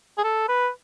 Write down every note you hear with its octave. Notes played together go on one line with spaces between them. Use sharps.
G#4
A4
B4